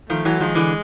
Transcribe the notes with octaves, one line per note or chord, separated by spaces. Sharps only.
D#3 F3 A3
E3 F#3
D#3 F3 G#3
D3 E3